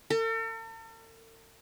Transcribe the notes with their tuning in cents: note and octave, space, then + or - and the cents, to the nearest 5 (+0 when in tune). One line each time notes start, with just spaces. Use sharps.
A4 +45